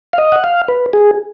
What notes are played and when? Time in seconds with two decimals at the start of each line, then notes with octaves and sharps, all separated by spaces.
0.13 F5
0.18 D#5
0.32 F#5
0.44 F5
0.68 B4
0.93 G#4